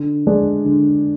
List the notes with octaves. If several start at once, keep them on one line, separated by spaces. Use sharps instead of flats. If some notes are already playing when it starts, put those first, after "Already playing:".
Already playing: D3
G#3 D4 G#4 D5
D3